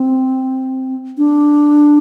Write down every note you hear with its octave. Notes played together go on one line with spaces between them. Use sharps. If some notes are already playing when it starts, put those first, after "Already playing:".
Already playing: C4
D4